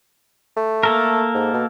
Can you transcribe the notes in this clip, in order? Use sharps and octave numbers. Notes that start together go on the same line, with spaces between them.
A3
A#3 A4 A#4
G#2
B2